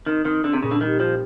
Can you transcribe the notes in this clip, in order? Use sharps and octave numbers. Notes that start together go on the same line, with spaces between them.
D#3 C4
D#3 C4
D3 C4
C3
A#2 C#3
D3
D#3 G3
F3 D#4